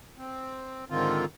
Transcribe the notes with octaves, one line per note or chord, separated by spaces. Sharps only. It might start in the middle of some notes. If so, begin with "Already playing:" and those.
C4
G#2 D3 D#3 C4 F4